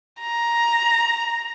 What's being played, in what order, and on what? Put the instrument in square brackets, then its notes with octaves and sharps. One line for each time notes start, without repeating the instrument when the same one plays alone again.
[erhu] A#5